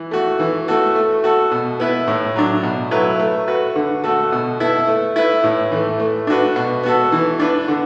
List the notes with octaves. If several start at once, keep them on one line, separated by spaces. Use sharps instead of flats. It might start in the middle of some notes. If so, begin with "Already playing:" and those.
Already playing: E3
A3 F#4
E3
A3 F#4 A4
A3
F#4 A4
B2
B3 E4 B4
A2
F#3 D4
B2
F#3 A3 E4 B4
A3
F#4 B4
D3
A3 F#4 A4
B2
B3 E4 A4
A3
E4 B4
A2
E3 A3
A3
D4 F#4 B4
B2
B3 F#4 A4
E3
D4 B4
D3